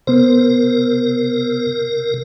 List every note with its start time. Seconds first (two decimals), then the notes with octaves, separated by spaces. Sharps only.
0.07 C3 B3 A#4 C5